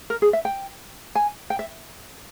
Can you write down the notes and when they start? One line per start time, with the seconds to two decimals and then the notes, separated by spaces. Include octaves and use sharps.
0.10 A#4
0.22 G#4
0.33 E5
0.45 G5
1.15 G#5
1.50 G5
1.59 E5